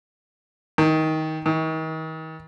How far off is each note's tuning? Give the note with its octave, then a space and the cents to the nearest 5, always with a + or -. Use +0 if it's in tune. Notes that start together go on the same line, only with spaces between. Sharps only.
D#3 +20
D#3 +40